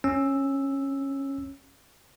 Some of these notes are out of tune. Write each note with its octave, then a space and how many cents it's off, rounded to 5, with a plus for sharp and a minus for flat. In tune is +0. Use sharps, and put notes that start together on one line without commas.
C#4 -15 E6 +0